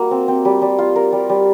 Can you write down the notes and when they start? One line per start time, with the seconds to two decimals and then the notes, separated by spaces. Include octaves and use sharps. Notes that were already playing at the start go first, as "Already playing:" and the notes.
Already playing: G3 A#3 F#4
0.11 C4
0.28 C4
0.45 G3
0.62 G3
0.79 F4
0.96 A#4
1.13 G3
1.29 G3